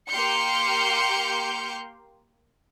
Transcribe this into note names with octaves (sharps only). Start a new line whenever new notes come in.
A#3 G4 C6 F6 G6 C#7